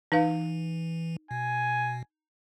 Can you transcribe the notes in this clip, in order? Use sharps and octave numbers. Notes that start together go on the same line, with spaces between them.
E3 D#4 B4 F5
B2 G#5